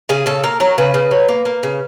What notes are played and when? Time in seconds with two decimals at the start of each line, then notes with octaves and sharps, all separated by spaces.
0.09 C#3 G#4
0.26 C#3 A4
0.44 A#3 A#4
0.60 F#3 A#4
0.78 C#3 B4
0.94 C#3
1.11 F#3
1.28 A#3
1.45 A#3
1.63 C#3